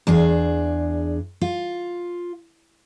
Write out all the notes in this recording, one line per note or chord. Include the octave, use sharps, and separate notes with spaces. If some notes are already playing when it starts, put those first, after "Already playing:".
E2 D4 G#4
F4